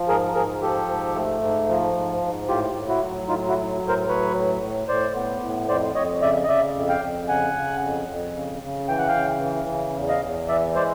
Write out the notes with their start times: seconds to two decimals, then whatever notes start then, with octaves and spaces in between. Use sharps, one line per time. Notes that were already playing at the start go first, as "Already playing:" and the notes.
Already playing: F3
0.08 G#2 G#4 A#4
0.35 G#2 G#4 A#4
0.61 F3 G4 A4
0.88 G#2
1.15 A3
1.42 G#2
1.68 F3
1.95 G#2
2.22 G#2
2.48 A2 F4 G4
2.75 A2
2.89 E4 F#4
3.02 F#3
3.28 A2 D#4 F4
3.48 E4 F#4
3.55 F#3
3.82 A2
3.88 A#4 C5
4.09 F#3 B4 C#5
4.35 A2
4.62 A2
4.88 A2 C5 D5
5.15 B3
5.42 A2
5.69 F2 C5 D5
5.95 F2 C#5 D#5
6.22 C#3 D5 E5
6.44 D#5
6.48 C#3 D5 E5
6.75 F2
6.89 F5 G5
7.02 F2
7.28 C#3 F#5 G#5
7.56 C#3
7.82 F2
8.09 F2
8.36 C#3
8.62 C#3
8.88 E3 G5
8.98 F#5
9.08 F5 G5
9.15 C#3
9.42 E3
9.69 C#3
9.96 E2
10.09 D#5 F5
10.22 E2
10.48 E3 D5 E5
10.75 G#3 C5 D5